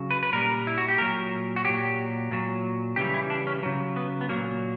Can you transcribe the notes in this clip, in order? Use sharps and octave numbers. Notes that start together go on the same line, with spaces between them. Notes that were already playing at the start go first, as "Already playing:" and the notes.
Already playing: C#3 F#3
B4
B4
A#2 G3 A#4
E4
F#4
G4
A#2 F#3 A#4
F#4
A#2 F#3 G4
A#2 F#3
C#3 E3 G3 G4
E4
D4
C#4
C#3 F#3
B3
B3
A#2 F#3 A#3